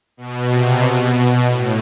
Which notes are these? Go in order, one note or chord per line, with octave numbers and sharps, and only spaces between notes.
B2
C3
B2
B2
A2